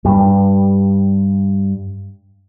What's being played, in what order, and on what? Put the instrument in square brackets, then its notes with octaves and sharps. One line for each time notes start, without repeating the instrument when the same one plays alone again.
[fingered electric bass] G2 G3